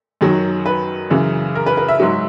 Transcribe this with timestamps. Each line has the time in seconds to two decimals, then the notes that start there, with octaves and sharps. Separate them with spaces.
0.21 F#2 D#3 F#3
0.66 B4
1.10 F#2 C#3 E3
1.55 A#4
1.66 B4
1.77 B4
1.88 E5
2.00 G#2 F#3